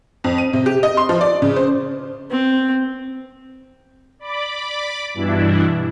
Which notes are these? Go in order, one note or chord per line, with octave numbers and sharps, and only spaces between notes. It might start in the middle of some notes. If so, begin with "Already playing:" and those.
F2
D#7
C3
G4
D#5
C6
F3
D5
C#3
C5
C4
D5 B5 D6
G2 B2 E3 D4 E4